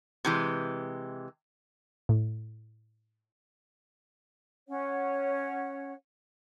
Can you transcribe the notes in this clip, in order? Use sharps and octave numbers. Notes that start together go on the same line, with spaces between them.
C3 E3 G#3
A2
C#4 C#5 F#5